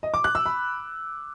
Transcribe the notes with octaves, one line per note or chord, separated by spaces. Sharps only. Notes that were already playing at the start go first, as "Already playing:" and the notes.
D#5
D6
F#6
E6
B5